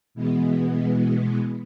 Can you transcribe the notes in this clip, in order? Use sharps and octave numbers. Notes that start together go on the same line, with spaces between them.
B2 E3 G#3 B3